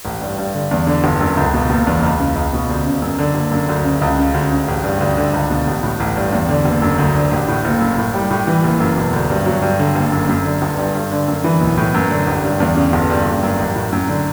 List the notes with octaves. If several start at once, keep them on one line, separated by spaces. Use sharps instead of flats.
A1
G2
G2
D3
E2
D3
G1
F#2
C#2
B2
F#1
E2
C#2
C#3
C#2
B2
D2
C#3
F#2
D3
F#1
F#2
D2
C#3
C#2
C#3
D2
C#3
A1
G2
D2
D3
C#2
B2
A1
A2
A1
G2
E2
D3
F#1
F#2
D2
D3
A1
A2
F#1
F#2
A2
G3
A2
E3
F#1
F#2
E1
D2
G2
F#3
G2
D3
F#1
F#2
F#2
D3
G1
G2
G2
D3
F#2
E3
B1
A2
F#2
D3
A1
G2
E2
C#3
G1
G2
F#1
F#2
A1
A2
F#2
D3